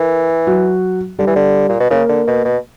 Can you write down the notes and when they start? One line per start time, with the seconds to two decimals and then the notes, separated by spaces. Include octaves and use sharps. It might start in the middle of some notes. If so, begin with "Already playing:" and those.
Already playing: E3 A#4
0.47 F#3 F#4
1.19 D3 G3 G4
1.27 E3
1.36 D3
1.69 A#2
1.80 B2
1.90 C#3 A#3 A#4
2.09 D3
2.27 B2
2.45 B2